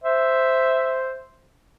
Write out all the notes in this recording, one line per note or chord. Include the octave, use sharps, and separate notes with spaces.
C5 E5